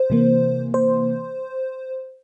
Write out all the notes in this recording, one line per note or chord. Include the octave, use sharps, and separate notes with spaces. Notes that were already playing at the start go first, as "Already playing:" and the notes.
Already playing: C5
C3 E3 A#3
C5